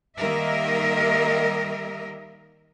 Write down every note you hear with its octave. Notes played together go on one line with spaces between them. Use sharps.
D#3 G3 A#3 A#4 D#5 E5